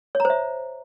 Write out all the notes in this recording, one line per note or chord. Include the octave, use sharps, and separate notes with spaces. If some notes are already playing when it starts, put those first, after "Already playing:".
C#5
A#5
C5
E5